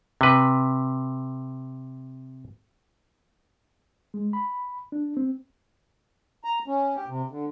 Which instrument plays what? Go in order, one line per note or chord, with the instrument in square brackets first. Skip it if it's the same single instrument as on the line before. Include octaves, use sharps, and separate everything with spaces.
[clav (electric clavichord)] C3 B4
[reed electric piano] G#3
B5
D4
C4
[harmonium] A#5
C#4
G4
C3
D3